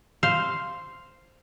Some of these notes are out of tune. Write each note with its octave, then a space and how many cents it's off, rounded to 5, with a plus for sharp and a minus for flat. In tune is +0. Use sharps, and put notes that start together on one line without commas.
C5 +0 F5 +0